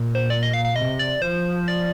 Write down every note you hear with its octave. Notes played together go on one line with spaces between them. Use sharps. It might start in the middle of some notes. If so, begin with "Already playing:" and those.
Already playing: A#2
C5
D5
D#5
F5
F5
C3 D#5
D5
F3 C5
D5